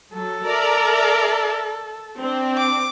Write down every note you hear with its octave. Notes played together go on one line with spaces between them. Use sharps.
F#3 A4
A#4 D5 E5
C4 D4
D6